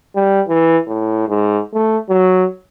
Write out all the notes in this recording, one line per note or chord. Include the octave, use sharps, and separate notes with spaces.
G3
E3
A2
G#2
A3
F#3